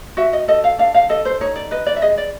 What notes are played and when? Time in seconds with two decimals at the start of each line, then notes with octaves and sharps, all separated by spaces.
0.17 F#4 E5
0.33 D#5
0.48 A4 D#5
0.64 F5
0.78 D4 F5
0.94 F5
1.09 A4 D#5
1.25 C5
1.41 D#4 C#5
1.56 D5
1.71 B4 D#5
1.86 D5
1.96 E5
2.02 G#4 D#5
2.18 D5